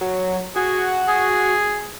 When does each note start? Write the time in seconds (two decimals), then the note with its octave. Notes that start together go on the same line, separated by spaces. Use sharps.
0.01 F#3
0.56 F#4 G#4
1.08 G#4